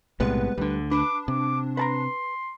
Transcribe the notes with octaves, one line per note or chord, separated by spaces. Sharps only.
B1 A2 C3 G3 G#3 B3 B4
D2 D3 G3
D4 B4 D6
C3 D6
B4 A5 A#5 C6